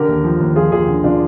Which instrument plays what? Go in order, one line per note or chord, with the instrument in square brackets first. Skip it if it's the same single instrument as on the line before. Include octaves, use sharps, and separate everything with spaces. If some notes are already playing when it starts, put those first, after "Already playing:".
Already playing: [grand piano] D3 G4 A#4
D#2
F3
D#2
F3 F4 G#4
D#2 F4 G#4
D3
D3 D4 F4